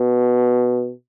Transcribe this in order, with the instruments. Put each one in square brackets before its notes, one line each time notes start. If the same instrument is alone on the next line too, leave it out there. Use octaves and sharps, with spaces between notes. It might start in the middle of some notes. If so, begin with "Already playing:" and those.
Already playing: [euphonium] B2